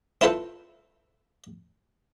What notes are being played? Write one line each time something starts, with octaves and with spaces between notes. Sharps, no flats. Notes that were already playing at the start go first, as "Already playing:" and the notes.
C4 E4 F4 A4 B4 C5